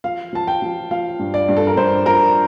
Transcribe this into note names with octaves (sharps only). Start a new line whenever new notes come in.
F3 F5
F3 A5
G5
F3
F3 F5
G2
D5
G2
A4
A#4
G2 C5
F3 A#4